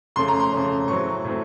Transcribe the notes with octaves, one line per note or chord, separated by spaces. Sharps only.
F2 C#3 A3 C#4 C6
A#5
C6
F2 C#3 A3 C#4
A2 F#3 A3 C4 C#6
A2 F#3 A3 C4